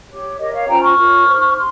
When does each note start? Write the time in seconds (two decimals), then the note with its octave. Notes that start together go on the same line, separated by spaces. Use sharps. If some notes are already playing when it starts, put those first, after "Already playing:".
0.09 G4 C#5
0.38 G4 A#4 C#5 D#5
0.52 C#5 F5
0.68 C#4 F4 C5 G5 A#5
0.82 C#6 F6
0.97 F4 A#4 C#5
1.27 D#4 G4 C5
1.55 C6